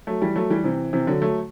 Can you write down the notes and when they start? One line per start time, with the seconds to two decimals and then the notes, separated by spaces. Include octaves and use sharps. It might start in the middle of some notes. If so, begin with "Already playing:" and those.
0.07 F#3 A3
0.21 E3 G3
0.36 F#3 A3
0.50 E3 G3
0.64 C3 E3
0.93 C3 E3
1.07 D3 F#3
1.22 F#3 A3